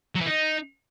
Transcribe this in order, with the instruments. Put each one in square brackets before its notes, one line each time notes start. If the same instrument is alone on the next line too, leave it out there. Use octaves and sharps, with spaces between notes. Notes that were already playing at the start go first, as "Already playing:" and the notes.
[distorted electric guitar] F#3
E3
D#4